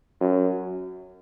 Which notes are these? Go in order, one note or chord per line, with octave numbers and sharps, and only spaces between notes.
F#2